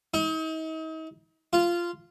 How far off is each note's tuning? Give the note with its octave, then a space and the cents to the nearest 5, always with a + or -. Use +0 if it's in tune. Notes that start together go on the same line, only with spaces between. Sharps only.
D#4 +40
F4 -10